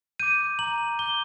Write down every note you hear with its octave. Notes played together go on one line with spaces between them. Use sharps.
D6 G6 D#7
A#5 F#7
D6 G6 G7